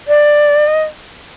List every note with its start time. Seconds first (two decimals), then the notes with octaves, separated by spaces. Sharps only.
0.08 D5
0.67 D#5